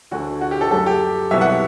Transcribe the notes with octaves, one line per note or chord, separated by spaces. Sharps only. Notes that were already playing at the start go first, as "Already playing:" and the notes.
D2 D3 A3 F#4
F#4
G4
A4
F#2 F#3 A3 A4
G4
C2 B2 F#3 B3 E5
F#5